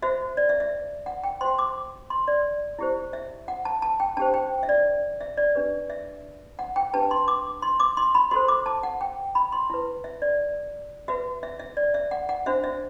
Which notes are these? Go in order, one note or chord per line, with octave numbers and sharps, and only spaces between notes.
F#4 C5 E5
D5
E5
E5
F#5
G5
F#4 C5 C6
D6
C6
D5
E4 G4 C5
E5
F#5
A5
A5
G5
D4 G4 C5 A5
G5
E5
D5
E5
D5
D4 G4 B4
E5
F#5
G5
D4 G4 B4 A5
C6
D6
C6
D6
C6
B5
F#4 A4 C5 C6
D6
A5
F#5
G5
B5
C6
E4 B4
E5
D5
F#4 B4 E5
E5
E5
D5
E5
F#5
F#5
D4 F#4 C5 E5
E5